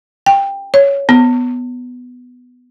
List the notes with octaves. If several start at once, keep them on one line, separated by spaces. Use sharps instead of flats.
G5
C#5
B3